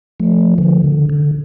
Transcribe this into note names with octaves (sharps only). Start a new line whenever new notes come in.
F3 A3
D3 F3
D3
D3